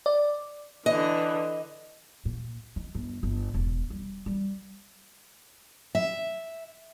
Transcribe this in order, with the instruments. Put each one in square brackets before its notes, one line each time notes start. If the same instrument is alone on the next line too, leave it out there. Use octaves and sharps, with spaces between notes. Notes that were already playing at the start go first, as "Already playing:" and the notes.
[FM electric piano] D5
[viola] D3 E3 [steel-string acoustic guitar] D#5
[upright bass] A#2
D#3
G1
G1
E1
G3
G3
[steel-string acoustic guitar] E5